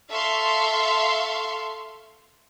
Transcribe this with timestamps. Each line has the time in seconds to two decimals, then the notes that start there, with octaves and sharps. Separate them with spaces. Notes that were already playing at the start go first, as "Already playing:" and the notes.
0.10 A4 E5 F5 C6 C#6